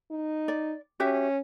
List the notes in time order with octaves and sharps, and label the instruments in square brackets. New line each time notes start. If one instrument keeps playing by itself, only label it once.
[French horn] D#4
[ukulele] D5
[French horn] C#4 [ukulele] F#4 G4 E5